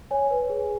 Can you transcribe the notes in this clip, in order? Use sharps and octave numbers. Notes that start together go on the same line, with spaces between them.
C#5 G#5
B4
G#4